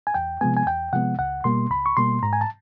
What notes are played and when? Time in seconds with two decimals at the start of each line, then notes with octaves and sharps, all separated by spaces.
0.07 G#5
0.14 E2 G5
0.41 C3 F3 G#3 B3 G#5
0.57 G#5
0.67 E2 G5
0.93 C3 F3 G#3 B3 F#5
1.19 C#2 F#5
1.44 B2 G3 A#3 C6
1.71 C#2 B5
1.86 C#6
1.97 B2 G3 A#3 C6
2.23 G#2 A#5
2.33 G#5
2.41 A5